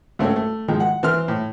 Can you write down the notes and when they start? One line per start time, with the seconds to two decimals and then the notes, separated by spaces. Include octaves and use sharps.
0.19 C#2 A3 C4 C#4 C#5
0.36 A3
0.68 D#3 F3 G#3
0.80 F#5
1.03 E3 C4 C6 F6
1.28 A2